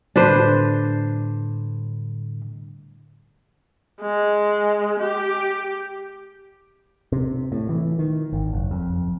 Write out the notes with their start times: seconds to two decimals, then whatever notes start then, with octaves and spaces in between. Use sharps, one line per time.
0.16 A2 D3 G3 D4 B4 C5
4.01 G#3
5.00 G4
7.12 C3
7.52 A2
7.69 E3
7.99 D#3
8.33 G#1
8.53 F#1
8.71 F2